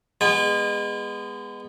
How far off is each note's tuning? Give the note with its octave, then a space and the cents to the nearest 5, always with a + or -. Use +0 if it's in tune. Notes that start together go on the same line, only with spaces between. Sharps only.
G#3 -20 B3 -5 G#5 -45